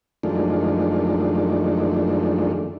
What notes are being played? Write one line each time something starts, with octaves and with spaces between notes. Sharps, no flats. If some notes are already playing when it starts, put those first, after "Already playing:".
F#2 D#3 F3 G#3 A3 D4